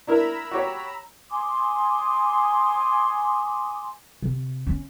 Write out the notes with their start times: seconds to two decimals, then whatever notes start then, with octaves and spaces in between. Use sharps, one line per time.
0.07 D4 E4 A#4 A#5 B5 E6
0.51 F#4 G4 C#5
1.30 G#5 C6 D6 D#6
4.22 C3
4.67 C#4